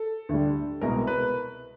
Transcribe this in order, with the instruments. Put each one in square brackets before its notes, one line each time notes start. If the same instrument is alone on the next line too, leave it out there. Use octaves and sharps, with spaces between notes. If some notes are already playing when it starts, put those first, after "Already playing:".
Already playing: [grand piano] A4
D2 D3 G3
C2 B2 G#3 A#4
B4